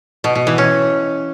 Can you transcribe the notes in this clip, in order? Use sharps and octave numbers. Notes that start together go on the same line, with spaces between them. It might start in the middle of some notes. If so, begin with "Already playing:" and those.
B2
B2
E3
C#4